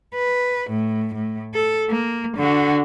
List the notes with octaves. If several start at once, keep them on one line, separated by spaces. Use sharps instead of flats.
B4
A2
A2
A4
A#3
D3 F#4